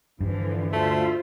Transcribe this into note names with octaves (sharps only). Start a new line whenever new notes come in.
G2 D3 E3 F3
D2 A3 F4 C5 E5